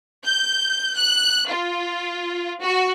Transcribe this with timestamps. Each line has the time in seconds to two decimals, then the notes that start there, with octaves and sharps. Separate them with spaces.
0.25 G6
0.96 F#6
1.49 F4
2.61 F#4